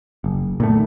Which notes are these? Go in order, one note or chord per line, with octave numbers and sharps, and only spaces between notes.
F#1
A#2 D#3 A3